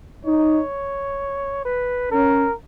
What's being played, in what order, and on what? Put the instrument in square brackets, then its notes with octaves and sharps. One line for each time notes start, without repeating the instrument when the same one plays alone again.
[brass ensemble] D#4 [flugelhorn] C#5
[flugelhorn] B4
[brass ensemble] C#4 [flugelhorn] A#4